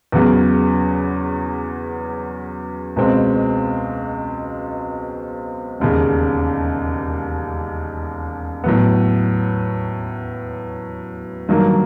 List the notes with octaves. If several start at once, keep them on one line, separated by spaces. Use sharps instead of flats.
E2 C#3 F#3 B3
C#2 B2 G#3 C4
E1 D#2 C#3
A2 F#3 B3
G2 D#3 F#3 A#3